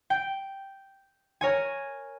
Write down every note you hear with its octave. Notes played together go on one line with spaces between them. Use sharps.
G5
A#4 C#5 G#5